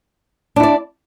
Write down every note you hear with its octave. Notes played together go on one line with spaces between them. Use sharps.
D4 E4 D5